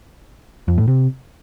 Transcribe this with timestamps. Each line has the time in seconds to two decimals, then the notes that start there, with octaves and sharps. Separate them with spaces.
0.68 F2
0.78 A2
0.88 C3